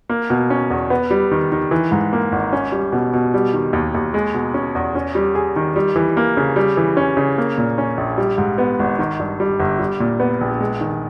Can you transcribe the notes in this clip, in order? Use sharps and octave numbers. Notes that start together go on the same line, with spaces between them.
A#3
B2
C#4
E2
B3
G3
D#3
D#3
E3
G#2
A#3
G#1
C#4
G3
B2
B2
G3
D#3
D#2
D#2
G#3
B2
C#4
E2
C#4
G3
G#4
D#3
G3
E3
A#3
C#3
G3
E3
C#4
C#3
A#3
A#2
C#4
A#1
G3
G#2
B3
G#1
D#3
G2
G3
G1
G3
A#2
B3
A#1
G#3
D#3